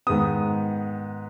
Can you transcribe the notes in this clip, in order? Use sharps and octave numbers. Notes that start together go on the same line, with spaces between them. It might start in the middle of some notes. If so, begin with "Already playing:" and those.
G#2 D#3 G#3 B3 D#6